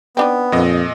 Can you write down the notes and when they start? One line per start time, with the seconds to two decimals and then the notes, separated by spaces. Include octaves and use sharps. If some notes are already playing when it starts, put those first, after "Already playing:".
0.17 B3 C4 D4 D#4
0.52 F2 A#2 D#5